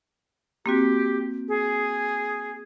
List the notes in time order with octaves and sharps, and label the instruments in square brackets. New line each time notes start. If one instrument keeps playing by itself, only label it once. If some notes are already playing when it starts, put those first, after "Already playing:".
[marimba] A#3 C4 F#4 [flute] G4
[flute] G#4